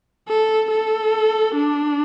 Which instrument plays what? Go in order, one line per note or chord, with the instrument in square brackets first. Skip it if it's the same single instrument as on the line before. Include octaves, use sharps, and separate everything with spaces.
[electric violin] A4
A4
D4